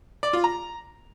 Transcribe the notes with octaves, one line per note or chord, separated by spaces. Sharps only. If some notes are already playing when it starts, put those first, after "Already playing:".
D5
F4
A#5